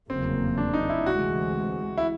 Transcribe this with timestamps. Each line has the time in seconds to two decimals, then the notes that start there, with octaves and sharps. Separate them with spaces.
0.09 F1 E2 C#3 F#3 A#3 C4
0.58 D4
0.74 D#4
0.90 E4
1.06 D2 C3 E3 G#3 F#4
1.98 E4